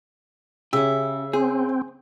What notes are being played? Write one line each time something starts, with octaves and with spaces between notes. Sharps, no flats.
C#3 C#4 G4 E5
C4 G#4